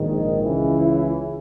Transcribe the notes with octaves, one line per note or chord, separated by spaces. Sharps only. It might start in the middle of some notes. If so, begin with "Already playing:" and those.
Already playing: A#1 G#2 D#3
C#2 C#3 E3
E4